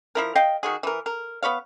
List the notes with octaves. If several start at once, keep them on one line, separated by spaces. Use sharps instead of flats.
F3 E4 A#4
D#5 F5 G5
D#3 F#4 G#4
E3 A#4
A#4
B3 B4 C#5 F5